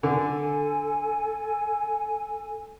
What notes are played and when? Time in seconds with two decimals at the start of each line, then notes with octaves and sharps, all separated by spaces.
0.03 D3 A4 G#5